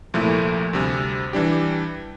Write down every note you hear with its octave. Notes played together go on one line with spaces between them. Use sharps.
C2 A#2 F3 A3 E4
D2 C3 G3
E3 G3 D4 G4